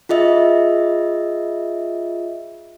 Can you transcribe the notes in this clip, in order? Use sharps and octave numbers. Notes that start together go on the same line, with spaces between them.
F4 G#4 D#5 E5